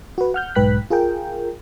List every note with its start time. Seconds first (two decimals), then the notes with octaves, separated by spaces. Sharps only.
0.18 F#4 B4
0.34 F#5 F6 G6
0.55 B1 G#2 B4 G5 F#6 B6
0.90 F4 G#4 A#4 G5